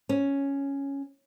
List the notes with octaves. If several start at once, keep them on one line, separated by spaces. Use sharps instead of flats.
C#4